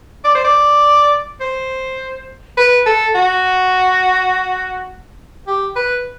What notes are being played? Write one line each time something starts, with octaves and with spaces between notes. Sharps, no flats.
D5
C5
D5
C5
B4
A4
F#4
G4
B4